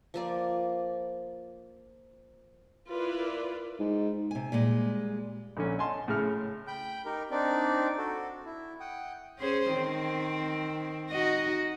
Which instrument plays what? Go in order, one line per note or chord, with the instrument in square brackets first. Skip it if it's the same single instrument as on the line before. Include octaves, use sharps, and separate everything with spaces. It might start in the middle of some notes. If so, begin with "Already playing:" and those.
[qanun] F3 A#3 D5
[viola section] E4 F4 A#4 B4 D5
[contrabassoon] G#2
[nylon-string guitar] C3 G#5
A#2 G3 G#3
[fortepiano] A#1 D3 C#4
D#5 G#5 A5 C6
A2 C#3 F6
[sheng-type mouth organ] G5 B5 G6
D#4 G4 A#4
C4 D4 D#4 D5
F#4 A4
E4
F#5 G5 D#6
[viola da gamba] C#4 G#4 C5
D#3 C4
D#4 F#4 D#5